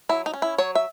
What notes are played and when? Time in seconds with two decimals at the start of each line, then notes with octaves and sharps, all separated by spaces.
0.09 F#3 E4
0.26 D#4
0.34 C#4
0.42 E4
0.58 F#3 C#5
0.75 E5